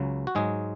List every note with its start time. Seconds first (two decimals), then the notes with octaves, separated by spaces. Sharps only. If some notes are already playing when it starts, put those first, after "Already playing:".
Already playing: C#2 C#3 F#3
0.27 F#4
0.35 G#2 F#3 G#3 G#4